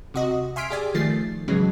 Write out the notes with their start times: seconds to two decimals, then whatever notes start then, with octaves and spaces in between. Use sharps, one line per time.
0.14 C3 F#4 D#5
0.56 E5 G#5 C6 F6 B6 D7
0.70 G4 G#4 D5 G#5
0.94 D#3 F3 A3 A6 C7
1.48 A2 C#3 E3 F#3 G#3